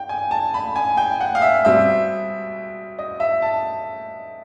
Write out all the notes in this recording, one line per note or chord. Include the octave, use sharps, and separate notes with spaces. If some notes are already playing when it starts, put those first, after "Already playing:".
Already playing: G5
G#5
A5
B5
G#5
G5
F#5
F5
E5
B2 G3 C4 E5
D#5
E5
A5